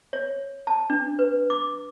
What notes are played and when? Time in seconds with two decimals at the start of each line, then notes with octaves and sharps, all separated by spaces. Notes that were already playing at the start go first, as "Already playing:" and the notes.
0.13 C#5
0.67 A5
0.90 D4
1.19 B4
1.50 D6